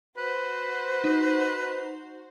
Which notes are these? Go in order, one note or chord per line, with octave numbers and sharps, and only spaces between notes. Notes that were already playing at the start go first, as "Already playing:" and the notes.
F#4 B4 C5
D#4